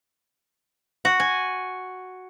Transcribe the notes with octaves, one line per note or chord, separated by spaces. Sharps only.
F#4
G#5